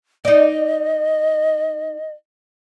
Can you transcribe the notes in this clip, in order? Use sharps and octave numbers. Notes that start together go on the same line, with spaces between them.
D#4 D5 D#5